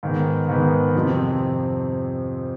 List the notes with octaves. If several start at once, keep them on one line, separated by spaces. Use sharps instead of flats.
G#2 D#3 B3
G#2 D#3 B3
F2 C3 F3 C4